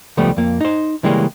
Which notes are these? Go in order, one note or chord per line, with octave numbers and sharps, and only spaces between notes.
C#2 F3 G3 A3 B3
F2 A#3
D#4 C5
C#3 E3 G3 G#3 A#3 C#4